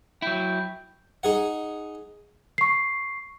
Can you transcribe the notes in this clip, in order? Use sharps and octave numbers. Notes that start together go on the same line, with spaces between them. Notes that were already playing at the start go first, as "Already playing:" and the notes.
F#3 E4 G5
D#4 G#4 F#5
C#6 C7